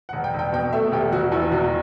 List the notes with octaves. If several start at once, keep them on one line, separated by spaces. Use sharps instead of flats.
F#5
E1
G5
E1
G5
B2 G5
A3 E5
E1 G4
E1 F#4
E2 E4
E1 F#4